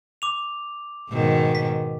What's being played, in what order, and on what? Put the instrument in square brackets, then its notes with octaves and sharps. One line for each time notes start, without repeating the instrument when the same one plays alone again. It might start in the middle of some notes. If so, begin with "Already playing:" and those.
[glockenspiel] D6 F7
[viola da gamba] G#2 B2 D#3
[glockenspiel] B6